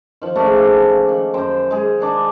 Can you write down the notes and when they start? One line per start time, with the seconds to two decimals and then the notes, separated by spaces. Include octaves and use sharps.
0.22 D#3 F3
0.36 C#3 A3 A#3 D4
1.09 D#3
1.34 F#2 C5 G5 A#5
1.71 G#3 G#4
2.00 D#3 D4 D6